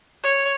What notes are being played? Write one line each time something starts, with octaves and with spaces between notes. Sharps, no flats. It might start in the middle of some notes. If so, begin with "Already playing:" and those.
C#5